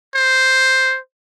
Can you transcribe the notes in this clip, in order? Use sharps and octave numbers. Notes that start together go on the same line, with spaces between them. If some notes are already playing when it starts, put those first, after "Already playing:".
C5